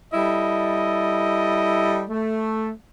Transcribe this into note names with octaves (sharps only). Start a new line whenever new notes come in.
G3 E4 A4 D#5
A3